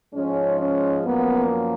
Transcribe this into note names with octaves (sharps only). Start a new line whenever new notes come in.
G#2 F3 G#3 C#4
C#4
F#2 F3 A#3 B3